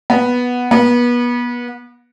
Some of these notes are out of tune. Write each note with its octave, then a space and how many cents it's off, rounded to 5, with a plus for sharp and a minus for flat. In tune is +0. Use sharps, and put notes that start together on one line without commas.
B3 -5
B3 -30